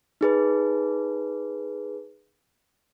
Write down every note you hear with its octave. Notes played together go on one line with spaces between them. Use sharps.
D#4 G#4 B4